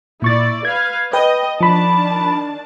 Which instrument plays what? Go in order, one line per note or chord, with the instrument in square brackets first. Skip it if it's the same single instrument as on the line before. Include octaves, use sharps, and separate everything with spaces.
[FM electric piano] A#2 C#6 A6 [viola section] E4 D5
[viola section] B4 F5 [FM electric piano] G#6
[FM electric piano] B4 G5 [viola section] D#5
[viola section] D#3 D4 A5 [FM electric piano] F3 B5